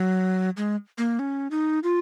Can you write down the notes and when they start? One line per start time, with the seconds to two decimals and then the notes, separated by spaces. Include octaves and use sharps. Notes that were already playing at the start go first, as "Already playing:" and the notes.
Already playing: F#3
0.57 G#3
0.98 A#3
1.19 C#4
1.51 D#4
1.83 F4